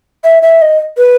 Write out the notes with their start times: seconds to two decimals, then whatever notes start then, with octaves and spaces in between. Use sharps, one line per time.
0.24 E5
0.43 E5
0.62 D#5
0.98 B4